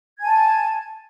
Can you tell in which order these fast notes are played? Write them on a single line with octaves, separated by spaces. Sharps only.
G#6 G#5 A5